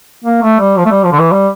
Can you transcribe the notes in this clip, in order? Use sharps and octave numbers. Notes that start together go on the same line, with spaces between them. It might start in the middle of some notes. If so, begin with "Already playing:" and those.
A#3
A3
G3
F3
A3
G3
F3
D3
E3
G3